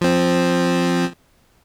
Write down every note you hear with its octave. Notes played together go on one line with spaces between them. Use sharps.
F3 C4